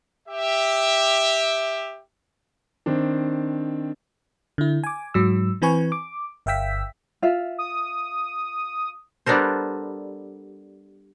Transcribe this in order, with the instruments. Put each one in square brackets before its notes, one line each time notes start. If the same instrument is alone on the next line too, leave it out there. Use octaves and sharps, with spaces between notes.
[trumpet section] G4 E5
[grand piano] D#3 C4 D4
[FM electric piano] D3 E4
G#5 D6
G#2 F#3 E6
E3 C4 B4 G#5 C#6
D6
G1 E5 F5 G5 E6 B6
[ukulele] F4 E5 F5
[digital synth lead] D#6
[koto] G3 B3 D4 A4 A#4 C5